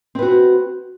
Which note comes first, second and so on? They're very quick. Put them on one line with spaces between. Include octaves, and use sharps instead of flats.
C4 B4 F#4